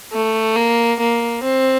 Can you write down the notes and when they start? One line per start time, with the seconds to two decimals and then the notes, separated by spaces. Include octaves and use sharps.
0.12 A3
0.56 A#3
1.00 A#3
1.44 C4